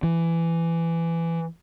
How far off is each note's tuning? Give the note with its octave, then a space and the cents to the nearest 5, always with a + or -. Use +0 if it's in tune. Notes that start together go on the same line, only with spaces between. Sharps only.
E3 +15